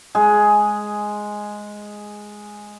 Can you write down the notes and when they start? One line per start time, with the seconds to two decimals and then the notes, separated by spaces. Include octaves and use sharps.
0.15 G#3 G#4